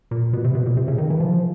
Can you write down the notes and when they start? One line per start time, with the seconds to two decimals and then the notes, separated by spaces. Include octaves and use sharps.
0.11 A#2
0.33 B2
0.44 C3
0.55 B2
0.66 A#2
0.77 C3
0.88 C#3
0.98 D#3
1.10 E3
1.20 F3